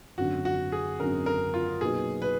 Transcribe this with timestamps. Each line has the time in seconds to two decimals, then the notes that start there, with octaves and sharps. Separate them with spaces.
0.18 G#1 F#2 D3 F#4
0.45 F#4
0.72 G#4
1.00 G#1 F#2 D3 A#4
1.26 A#4
1.54 F4
1.81 B1 A#2 F#3 B3 D#4 G#4
2.22 B4